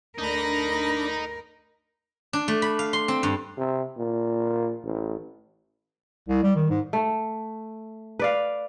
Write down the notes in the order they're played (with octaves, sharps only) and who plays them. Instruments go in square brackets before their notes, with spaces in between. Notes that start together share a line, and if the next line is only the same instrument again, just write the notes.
[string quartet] D2 B5 A#6 [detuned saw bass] D4 [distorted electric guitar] D#4 [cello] A#4
[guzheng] D4
A3
B5
F5
C6
C4
G2
[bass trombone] C3
A#2
A1
[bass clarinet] C2
G3
D#3
G#2
[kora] A3
B4 D5 F5